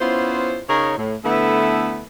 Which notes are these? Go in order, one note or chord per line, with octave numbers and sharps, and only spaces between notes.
B3 C#4 E4 F4 C5
C#3 D#4 G#4 A#4 C#5
A2
D3 A3 B3 E4 A4 B4